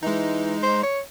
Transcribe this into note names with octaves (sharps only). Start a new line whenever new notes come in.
E3 G#3 D#4
C5
C#5